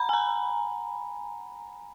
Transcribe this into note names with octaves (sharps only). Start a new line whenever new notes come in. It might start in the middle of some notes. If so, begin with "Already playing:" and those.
Already playing: F#5 A#5 B5
G#5
A#5